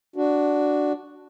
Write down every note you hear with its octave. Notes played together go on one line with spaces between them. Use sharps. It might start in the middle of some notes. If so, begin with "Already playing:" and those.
D4 F#4